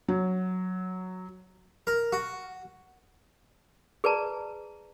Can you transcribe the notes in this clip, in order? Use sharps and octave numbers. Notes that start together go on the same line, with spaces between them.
F#3
A#4
F#4
G#4 B4 D5 A5 A#5